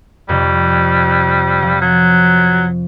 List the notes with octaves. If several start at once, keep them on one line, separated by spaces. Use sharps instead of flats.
F2 C3 G3
F3
F#3